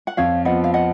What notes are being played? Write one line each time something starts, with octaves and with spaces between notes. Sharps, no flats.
F#5
F2 C#5 F5
F3 B3 D#5 F#5
F5
D#5 F#5